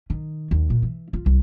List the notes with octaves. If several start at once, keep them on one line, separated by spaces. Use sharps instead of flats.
D#3
D#2
A#2
E3
F4
C2